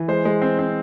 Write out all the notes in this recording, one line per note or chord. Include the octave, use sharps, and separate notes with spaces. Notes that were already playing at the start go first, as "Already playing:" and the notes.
Already playing: E3
G#3 C5
G#3
C4
C4